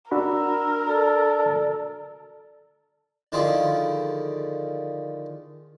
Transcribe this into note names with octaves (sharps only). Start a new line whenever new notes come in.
D4 F#4 A#4 B5 E6
A4 D5
D3 D#3 F3 E4 F4 G#4